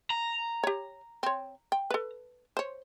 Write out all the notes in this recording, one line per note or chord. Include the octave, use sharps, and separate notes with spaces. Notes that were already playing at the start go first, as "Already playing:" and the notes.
A#5
G4 C#5
C4 C#5
G5
A4 B4
C5 C#5